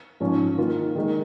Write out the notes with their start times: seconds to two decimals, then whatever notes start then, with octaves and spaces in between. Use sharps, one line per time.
0.20 G#2 F3 C#4
0.57 D#3 A#3 F4
0.95 D#3 G#3 D#4